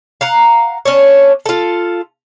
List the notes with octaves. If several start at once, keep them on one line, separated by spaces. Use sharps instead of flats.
F5 F#5 A#5
C#4 D4 C#5
F4 A4